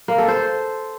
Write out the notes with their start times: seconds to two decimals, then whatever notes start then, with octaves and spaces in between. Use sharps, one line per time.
0.08 A#3
0.18 A4
0.28 C5